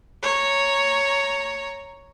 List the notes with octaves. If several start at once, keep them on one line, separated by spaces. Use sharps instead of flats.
C#5 A#5